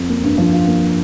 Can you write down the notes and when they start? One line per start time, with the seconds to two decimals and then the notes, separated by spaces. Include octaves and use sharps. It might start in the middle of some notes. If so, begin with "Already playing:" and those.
Already playing: F2
0.09 A#3
0.23 G2
0.38 F3
0.53 F4
0.67 A#3